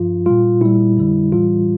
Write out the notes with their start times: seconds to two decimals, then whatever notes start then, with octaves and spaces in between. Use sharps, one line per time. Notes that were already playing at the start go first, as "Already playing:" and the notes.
Already playing: G2 F3 F4
0.26 A#2 G3 F4
0.61 A#2 G3 E4
0.97 F2 D3 G3
1.32 A2 E3 G3 F4